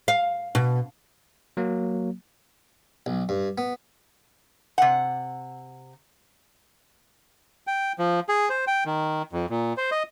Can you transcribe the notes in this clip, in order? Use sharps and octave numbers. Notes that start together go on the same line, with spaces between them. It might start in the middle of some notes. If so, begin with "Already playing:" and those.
F5
B2
F#3 A#3
B1
G2
B3
C3 F#5
G5
F3
G#4
C5
G5
D#3
F2
A#2
C5
D#5